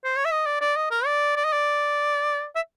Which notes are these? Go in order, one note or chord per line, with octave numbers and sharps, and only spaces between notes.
C5
C#5
E5
D#5
D5
D5
D#5
A#4
D5
D5
D#5
D5
E5